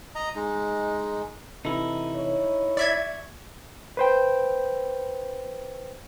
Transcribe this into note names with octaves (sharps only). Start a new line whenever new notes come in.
D#5 A#5
G#3 D#4
C3 E3 D#4 E4 A4
C#5
D5 E5 C#6 G#6
B4 C5 G5